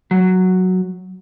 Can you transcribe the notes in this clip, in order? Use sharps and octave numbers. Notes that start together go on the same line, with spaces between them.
F#3